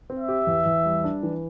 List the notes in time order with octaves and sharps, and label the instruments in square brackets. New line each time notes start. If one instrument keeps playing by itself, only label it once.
[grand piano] C4
[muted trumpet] E5
[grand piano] G4
E2
E2
G3
D4
E3